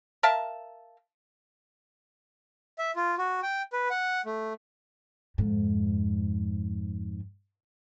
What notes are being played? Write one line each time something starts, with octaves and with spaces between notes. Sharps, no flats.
A#4 E5 F5 A5
E5
F4
F#4
G5
B4
F#5
A3
F2 G#2